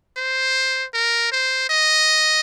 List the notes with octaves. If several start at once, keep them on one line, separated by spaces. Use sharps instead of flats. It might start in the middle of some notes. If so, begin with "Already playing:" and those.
C5
A#4
C5
D#5